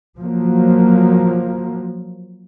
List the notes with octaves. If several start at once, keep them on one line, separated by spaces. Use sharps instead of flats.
F3 F#3 A#3